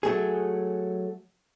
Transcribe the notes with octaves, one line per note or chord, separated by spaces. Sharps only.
F#3 A3 G#4